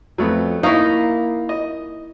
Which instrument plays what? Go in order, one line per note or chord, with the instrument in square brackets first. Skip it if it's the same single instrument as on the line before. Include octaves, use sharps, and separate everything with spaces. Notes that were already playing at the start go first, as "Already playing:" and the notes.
[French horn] F2 [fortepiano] F#3 A3 B3
[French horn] A#3 [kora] D#4 E4 [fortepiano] F5 C#6
[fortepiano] D#5